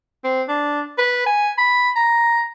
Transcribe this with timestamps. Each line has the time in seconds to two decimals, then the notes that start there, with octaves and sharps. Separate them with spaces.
0.24 C4
0.49 D4
0.98 B4
1.26 G#5
1.58 B5
1.96 A#5